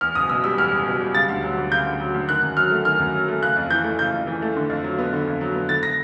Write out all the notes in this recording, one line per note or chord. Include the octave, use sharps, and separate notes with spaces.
E2 F6
F#1 D#6
B2 E6
G3 E6
E2 F6
F#1
B2
G3
C#3 A6
D2
F#3
D2
C#3 G6
D2
F#3
D2
D#3 F#6
F#2
F#3 F6
A3
D#3 F6
F#2
F#3
A3
C#3 F#6
F2
E3 G6
A3
C#3 G6
F2
E3
A3
D3
F2
F#3
B3
D3
F2
F#3
B3
D3 A6
A#6